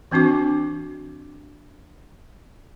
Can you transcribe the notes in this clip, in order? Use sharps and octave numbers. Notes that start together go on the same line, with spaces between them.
E3 C4 D4 F#4 D6